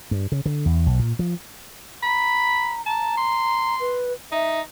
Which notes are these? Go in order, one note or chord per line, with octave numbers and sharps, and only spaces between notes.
G2
C#3
D3
E2
B1
A#2
F3
A#5 B5
A5 A#5
C6
B4
D#4 E5